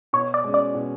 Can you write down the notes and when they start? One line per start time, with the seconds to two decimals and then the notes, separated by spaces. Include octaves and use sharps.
0.13 B2 C#5
0.34 D5
0.44 G#3 C#4
0.54 D5
0.75 B2